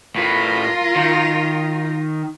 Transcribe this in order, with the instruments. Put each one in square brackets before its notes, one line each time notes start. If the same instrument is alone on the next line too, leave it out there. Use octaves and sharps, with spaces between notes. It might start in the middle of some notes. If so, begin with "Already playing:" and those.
[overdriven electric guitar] A2 B4 [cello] F4 A#4
[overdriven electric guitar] D#3